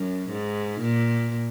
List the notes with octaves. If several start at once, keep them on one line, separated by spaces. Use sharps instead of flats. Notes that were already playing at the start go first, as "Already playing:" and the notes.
Already playing: F#2
G#2
A#2